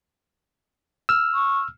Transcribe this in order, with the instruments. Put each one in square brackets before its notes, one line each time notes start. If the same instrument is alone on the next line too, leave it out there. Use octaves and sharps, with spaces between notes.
[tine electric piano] E6 F6
[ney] C#6